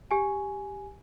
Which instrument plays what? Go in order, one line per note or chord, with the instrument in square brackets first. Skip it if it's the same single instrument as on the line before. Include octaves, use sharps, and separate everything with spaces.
[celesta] G4 G#5